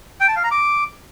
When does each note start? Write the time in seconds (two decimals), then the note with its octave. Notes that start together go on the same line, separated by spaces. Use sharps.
0.20 G5
0.28 A5
0.36 F5
0.44 A#5
0.51 D6